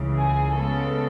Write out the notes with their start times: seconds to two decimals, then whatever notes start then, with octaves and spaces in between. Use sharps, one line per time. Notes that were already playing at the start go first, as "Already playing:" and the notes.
Already playing: C#2 C#3 E3
0.17 G#4
0.54 C#3 G#3 B3 A4